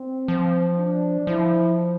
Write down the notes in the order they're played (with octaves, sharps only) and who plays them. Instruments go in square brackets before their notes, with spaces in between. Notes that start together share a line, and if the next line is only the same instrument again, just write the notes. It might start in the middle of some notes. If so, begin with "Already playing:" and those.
Already playing: [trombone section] C4
[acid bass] F3
[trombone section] D4
[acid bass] F3 [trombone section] E4